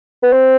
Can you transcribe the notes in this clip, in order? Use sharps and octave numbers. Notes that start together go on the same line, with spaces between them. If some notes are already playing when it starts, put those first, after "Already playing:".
B3
C4